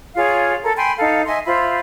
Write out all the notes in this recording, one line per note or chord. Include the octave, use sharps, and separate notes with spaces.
F4 G#4 C#5 F5
A4 A#4
G5 G#5 B5 C6
D#4 A4 F5
D#5 E5 G#5 C6
F4 C5 E5 B5